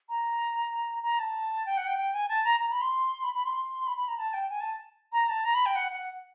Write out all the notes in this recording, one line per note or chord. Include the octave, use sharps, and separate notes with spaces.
A#5
A#5
A5
G5
F#5
G5
G5
G#5
A5
A#5
A#5
B5
C6
B5
B5
C6
C6
C6
B5
B5
A#5
A5
G5
G#5
A5
A#5
A5
A#5
B5
G5
F#5
F#5